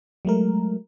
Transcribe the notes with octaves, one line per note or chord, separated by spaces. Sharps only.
F#3 G#3 A3 A#4